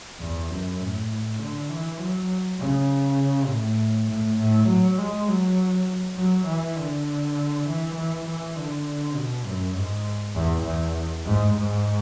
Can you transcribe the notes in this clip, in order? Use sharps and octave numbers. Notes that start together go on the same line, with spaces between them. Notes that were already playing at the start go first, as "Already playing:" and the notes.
E2
F#2
A2
D3
E3
F#3
C#3
A2
A2
A2
F#3
G#3
F#3
F#3
E3
D3
E3
E3
E3
D3
D3
B2
F#2
G#2
E2
E2
G#2
G#2